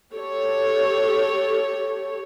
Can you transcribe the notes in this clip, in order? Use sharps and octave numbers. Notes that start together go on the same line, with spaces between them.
G4 A4 C#5